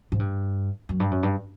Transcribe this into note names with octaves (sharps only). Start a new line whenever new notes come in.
G#2
G2
F#2
G2
F#2
G2